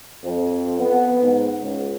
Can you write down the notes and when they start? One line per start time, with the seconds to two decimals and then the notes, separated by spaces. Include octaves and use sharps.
0.23 F2
0.79 B3
1.21 G#2
1.61 C#2